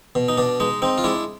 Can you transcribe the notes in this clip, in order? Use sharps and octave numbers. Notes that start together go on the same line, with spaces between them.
B2
D#4
B2 D4
G#3 D#4
C4 D#4
F4
G#3 D4 E4